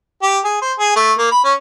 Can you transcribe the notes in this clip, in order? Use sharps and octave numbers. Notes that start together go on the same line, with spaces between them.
G4
G#4
C5
G#4
A3
A#3
B5
C#4